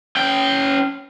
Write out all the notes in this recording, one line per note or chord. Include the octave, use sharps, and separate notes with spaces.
C#4 G5